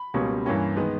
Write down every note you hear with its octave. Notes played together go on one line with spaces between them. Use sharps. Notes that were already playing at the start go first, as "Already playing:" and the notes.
Already playing: B5
C#2 B2 G3 A#3 C#4
G2 E3 A#3 C#4
D#3 G#3 B3